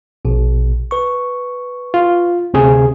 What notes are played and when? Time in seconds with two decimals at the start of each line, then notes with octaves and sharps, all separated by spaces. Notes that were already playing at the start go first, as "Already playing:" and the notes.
0.25 A#1 B2
0.91 B4 C#6
1.94 F4
2.54 D2 C3 G#4